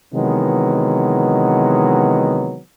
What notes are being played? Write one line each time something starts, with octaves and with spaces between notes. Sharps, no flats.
C3 D#3 E3 F#3 G#3 B3